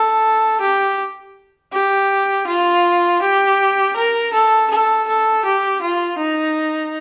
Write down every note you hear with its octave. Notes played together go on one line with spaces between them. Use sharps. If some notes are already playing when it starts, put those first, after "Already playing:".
Already playing: A4
G4
G4
F4
G4
A#4
A4
A4
A4
G4
F4
D#4